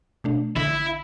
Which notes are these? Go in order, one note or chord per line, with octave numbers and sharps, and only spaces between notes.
B2 A3 D4
A#1 D3 E4